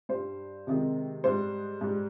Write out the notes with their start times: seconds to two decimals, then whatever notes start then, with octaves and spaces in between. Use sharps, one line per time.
0.09 G2 G3 C5
0.67 C3 D#3 G#3
1.24 G#2 G3 C5
1.81 G#2 G3